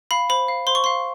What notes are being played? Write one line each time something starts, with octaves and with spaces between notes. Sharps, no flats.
F5 B5
C5 B5
F5
C5 C6
C#6
F5 C6